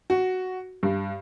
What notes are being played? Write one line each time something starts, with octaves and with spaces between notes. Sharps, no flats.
F#4
G2